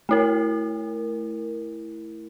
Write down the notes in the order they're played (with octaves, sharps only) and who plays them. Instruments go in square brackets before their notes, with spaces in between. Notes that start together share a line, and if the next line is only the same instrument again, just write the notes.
[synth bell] A3 E4 A#4